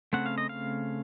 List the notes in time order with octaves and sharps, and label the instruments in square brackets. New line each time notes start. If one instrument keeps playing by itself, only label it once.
[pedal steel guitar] C#3 A3 C4 F#5
F5
D#5
F5